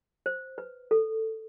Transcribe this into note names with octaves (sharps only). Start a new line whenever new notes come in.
C5
B4
A4